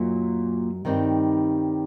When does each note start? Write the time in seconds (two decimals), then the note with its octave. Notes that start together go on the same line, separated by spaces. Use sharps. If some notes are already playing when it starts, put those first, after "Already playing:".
Already playing: F#2 A#2 F#3 D#4
0.85 G2 D#3 G3 C4 D#4